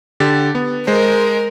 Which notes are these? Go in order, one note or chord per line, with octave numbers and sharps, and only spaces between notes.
D3 G4 A6
B3
G#3 A#4 C5